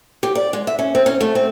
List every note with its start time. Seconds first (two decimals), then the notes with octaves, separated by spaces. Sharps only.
0.23 G4
0.35 D5
0.53 G#3
0.67 E5
0.79 C#4
0.95 C4
1.06 C#4
1.21 A3
1.35 C4